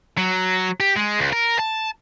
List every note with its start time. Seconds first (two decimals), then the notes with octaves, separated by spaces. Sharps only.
0.18 F#3
0.80 G4
0.96 G#3
1.19 C#2
1.33 A#4
1.60 A5